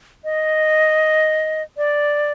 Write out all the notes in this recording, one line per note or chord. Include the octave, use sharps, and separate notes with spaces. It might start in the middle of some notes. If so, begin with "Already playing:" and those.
D#5
D5